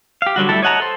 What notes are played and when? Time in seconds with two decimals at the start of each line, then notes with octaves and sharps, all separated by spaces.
0.22 G4 F5
0.36 D3 F#3 G3 F#4
0.49 G3 A3 E4 A4 A5
0.62 C#5 D#5 F#5 A5 A#5
0.80 A4 C5